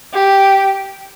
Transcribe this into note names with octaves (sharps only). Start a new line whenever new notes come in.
G4